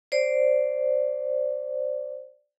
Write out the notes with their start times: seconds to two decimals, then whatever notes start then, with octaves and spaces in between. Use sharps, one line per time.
0.12 C5 D5